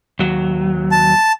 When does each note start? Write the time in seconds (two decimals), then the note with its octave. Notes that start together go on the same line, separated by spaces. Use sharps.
0.19 D#2 F#3
0.91 A5